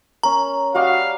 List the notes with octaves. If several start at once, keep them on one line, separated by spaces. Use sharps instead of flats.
C#4 A#4 A#5
G3 F#4 D#5 F5 D6